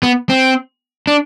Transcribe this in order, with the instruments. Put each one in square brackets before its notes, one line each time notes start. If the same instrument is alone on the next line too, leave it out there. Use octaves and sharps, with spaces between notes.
[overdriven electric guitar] B3
C4
D4